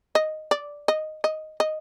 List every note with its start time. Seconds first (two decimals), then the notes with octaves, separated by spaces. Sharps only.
0.15 D#5
0.51 D5
0.88 D#5
1.24 D#5
1.60 D#5